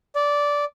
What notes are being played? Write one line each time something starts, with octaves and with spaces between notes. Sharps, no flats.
D5